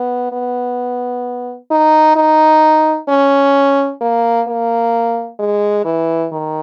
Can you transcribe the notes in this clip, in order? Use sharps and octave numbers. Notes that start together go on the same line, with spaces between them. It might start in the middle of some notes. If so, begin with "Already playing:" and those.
Already playing: B3
B3
D#4
D#4
C#4
A#3
A#3
G#3
E3
D#3